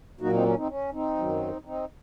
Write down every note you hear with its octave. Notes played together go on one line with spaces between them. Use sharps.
A#2 F#3 A#3 D#4 F#4
C4 D#4
C#4
C4 D#4
C#4
C4 D#4
F#2 D#3 F#3
C4 D#4